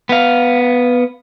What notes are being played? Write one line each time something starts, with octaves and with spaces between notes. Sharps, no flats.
B3 F5